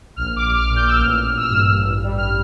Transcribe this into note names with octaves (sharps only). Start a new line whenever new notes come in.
A#1 F6
D6
A#1
F6
A#2
G6
E6
A1 F6
A1
E6
F6
G2 E6
A1
G3
F6